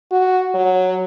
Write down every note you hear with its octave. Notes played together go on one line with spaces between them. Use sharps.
F#4
F#3